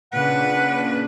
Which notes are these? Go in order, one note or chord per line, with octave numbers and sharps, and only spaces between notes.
A#2 C#3 D4 B4 F#5